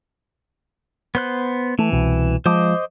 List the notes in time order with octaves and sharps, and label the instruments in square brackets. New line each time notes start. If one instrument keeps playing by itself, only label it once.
[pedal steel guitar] B3 C5 F#6
[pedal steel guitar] E3 [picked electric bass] A3
[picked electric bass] C2 B2 C4
[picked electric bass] F3 G#3 [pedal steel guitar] C5 D#5 D6